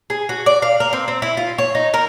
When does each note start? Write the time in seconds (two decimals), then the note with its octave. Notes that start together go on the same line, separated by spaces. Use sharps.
0.10 G#4
0.29 F#4
0.46 D5
0.62 F5
0.80 A#4
0.93 C4
1.08 C4
1.22 E4
1.37 F4
1.58 C#5
1.75 D#4
1.94 A#4